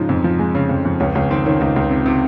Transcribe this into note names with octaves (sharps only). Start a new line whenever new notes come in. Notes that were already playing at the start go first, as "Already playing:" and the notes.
Already playing: G#2 C#3 F3 D#4
F2
F3
G#3
C#3
F2
F2
C#2 C#4
C#2 C#4
D#3 C4
D#3 C#4
C#2 D#4
C#2
C3
C3